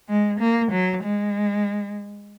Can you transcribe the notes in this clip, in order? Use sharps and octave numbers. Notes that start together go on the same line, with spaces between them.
G#3
A#3
F#3
G#3